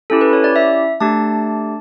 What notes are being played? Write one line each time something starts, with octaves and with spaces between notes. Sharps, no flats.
C#4 E4 G4 A4
B4
C#5
D5
E5
A3 D4 G4 A5